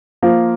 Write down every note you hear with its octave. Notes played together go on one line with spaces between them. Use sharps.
F3 A#3 F4